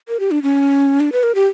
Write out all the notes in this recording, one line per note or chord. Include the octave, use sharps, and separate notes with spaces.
A#4
G4
D4
C#4
D4
B4
A#4
G4